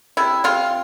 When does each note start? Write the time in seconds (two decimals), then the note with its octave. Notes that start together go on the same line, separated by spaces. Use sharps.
0.17 C3 E4
0.44 C3 F4